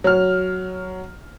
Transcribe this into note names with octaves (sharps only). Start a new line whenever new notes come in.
F#3 F6